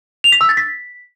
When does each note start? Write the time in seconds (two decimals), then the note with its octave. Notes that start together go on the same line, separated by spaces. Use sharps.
0.24 F7
0.32 B6
0.41 E6
0.49 A6
0.57 B6